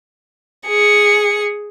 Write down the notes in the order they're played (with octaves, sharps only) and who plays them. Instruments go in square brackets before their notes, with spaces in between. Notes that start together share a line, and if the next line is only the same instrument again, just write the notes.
[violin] G#4 C#7